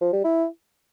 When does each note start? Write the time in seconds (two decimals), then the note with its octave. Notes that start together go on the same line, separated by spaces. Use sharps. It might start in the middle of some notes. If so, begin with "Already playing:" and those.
0.01 F3
0.13 G3
0.24 E4